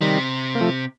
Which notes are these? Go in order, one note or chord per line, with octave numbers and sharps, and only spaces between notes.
C3 D#3 G3
A#3
F3 A3